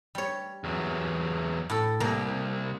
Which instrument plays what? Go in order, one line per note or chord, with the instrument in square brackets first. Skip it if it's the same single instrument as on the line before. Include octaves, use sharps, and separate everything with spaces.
[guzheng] G3 C#5
[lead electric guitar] E2 F#3
[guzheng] A2 A4
[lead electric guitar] C2 [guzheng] A#3